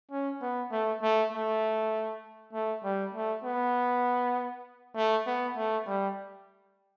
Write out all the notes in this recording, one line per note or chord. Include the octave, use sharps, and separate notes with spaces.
C#4
B3
A3
A3
A3
A3
G3
A3
B3
A3
B3
A3
G3